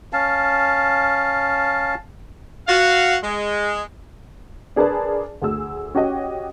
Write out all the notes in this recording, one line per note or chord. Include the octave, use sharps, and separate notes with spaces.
C#4 F5 A5
F#4 F5
G#3
D4 G#4 A#4 B4 D5 A5
D2 G#4 E6
C#4 F#4 G4 C#5 D#5